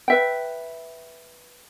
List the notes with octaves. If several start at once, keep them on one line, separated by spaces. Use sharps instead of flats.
B4 E5 G5